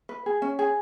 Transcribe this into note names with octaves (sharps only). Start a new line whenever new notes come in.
B4
G#4
C#4
G#4